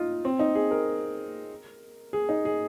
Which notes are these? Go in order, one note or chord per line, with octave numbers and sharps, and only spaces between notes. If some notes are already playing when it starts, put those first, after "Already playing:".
Already playing: D#4 F4
C4
D#4
G#4
A#4
G#4
D#4
G#4